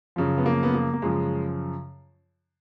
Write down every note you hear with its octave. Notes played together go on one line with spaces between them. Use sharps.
F#2 C#3 F3
B3
A#3
B3
A#3
A#3
F#2 C#3 F3 G#3